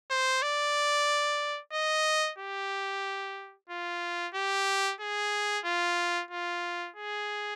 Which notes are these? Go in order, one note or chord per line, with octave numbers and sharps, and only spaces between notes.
C5
D5
D#5
G4
F4
G4
G#4
F4
F4
G#4